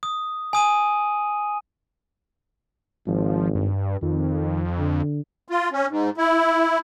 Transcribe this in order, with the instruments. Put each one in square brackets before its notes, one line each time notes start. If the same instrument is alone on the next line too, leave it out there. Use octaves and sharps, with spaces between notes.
[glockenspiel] D#6
G#5 D#6 D#7
[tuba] G#1 [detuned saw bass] F3
[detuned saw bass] G2
[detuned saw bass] F2 [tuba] D#3
[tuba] D3
[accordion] F4
C#4
G#2
E4